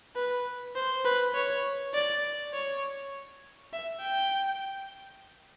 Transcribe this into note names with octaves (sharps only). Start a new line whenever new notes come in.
B4
C5
B4
C#5
D5
C#5
E5
G5